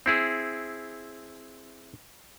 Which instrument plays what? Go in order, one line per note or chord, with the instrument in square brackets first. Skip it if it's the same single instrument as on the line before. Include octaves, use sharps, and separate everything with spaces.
[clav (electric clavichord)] C4 E4 G#4